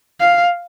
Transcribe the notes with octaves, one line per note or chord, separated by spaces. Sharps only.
F5